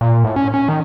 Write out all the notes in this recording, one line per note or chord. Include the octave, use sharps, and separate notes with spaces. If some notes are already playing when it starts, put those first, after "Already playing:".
A#2
A2
C#4
C#4
D#3